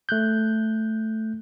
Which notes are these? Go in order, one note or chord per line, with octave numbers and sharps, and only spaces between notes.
A3 F#6 G6